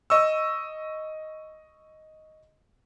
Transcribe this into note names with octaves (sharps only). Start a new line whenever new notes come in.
D#5 C#6 E6